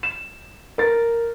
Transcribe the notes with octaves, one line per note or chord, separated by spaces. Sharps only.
E7
A#4 A6